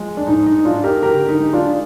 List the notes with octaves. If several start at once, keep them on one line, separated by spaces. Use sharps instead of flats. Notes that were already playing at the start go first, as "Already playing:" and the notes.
Already playing: F3 G#3
D4
G#2 D#4
D#4
G#2 D4 F4
G4 A#4
D3 G4 A#4
D#4
G#3
D4 F4